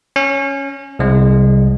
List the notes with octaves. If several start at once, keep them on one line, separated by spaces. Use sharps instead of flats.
C#4
C2 G#3